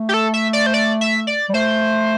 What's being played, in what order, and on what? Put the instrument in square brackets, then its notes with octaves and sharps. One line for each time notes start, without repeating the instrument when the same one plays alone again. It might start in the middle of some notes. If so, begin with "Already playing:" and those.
Already playing: [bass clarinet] A3
[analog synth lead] G4
A4
E5
D5
C5
D5
E5
D5
[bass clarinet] G3
[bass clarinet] A3 [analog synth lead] C5